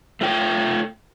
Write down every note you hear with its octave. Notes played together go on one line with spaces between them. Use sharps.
A3 F4 G5